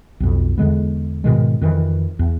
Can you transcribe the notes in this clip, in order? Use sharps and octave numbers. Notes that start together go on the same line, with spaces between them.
B1 F2
E2 D3 G#3 B3
G#2 B2 D#3 G#3
F2 D#3 E3
E2